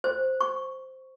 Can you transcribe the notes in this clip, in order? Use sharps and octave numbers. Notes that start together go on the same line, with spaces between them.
C5
C#6